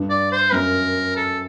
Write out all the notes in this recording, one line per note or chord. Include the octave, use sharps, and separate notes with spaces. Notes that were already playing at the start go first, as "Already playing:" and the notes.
Already playing: G2
D5
C5
F#2 A#4
A4